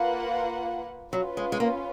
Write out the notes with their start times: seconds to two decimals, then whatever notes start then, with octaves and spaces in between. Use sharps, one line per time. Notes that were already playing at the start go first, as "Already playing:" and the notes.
Already playing: A#3 F4 B4 F#5
1.12 F#3 C#4 F4 B4
1.37 G#3
1.52 G#3
1.60 A#3